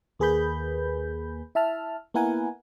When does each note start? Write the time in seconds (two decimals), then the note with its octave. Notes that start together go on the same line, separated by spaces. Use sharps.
0.19 D#2 A#3 G#4 B4 B5 G6
1.55 E4 E5 A5 F6
2.14 A#3 B3 E4 A#4 F#5 G#5